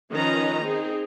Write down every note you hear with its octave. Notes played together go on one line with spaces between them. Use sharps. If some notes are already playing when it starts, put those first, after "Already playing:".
D#3 F3 C#4 B4 D#5 A#5
C4 D#4 G#4